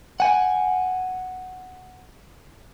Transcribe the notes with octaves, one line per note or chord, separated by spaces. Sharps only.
F#5 G#5